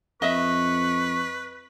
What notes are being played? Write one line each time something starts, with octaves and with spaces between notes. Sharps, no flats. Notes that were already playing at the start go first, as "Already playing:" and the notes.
F2 B4 D#5 E5 C#6